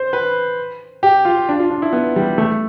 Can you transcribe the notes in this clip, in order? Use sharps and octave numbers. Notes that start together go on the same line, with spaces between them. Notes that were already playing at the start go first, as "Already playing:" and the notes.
Already playing: C5
B4
G4
F4
D4
F4
D4
E4
B3
G3
A3